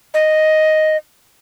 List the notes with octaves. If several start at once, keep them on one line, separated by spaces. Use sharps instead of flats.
D#5